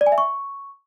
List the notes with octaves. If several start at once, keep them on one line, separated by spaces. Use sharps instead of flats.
D5
G#5
E5
C#6